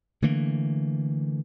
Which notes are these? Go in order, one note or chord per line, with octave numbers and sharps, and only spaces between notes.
D3 E3 A3 A#3